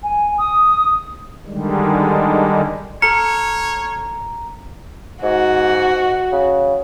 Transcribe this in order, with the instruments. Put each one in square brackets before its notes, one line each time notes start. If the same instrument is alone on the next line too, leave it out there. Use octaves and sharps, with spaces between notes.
[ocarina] G#5
D#6
[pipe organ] D3 D#3 G3 G#3
[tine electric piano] A4 F6 [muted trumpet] C#5 [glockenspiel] A#5 [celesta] C#7
[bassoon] G#2 [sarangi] F#4
[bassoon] C#3